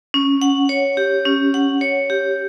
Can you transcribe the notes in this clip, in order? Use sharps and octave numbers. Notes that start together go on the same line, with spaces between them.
C#4
F#5
C#5
G4
C#4
F#5
C#5
G4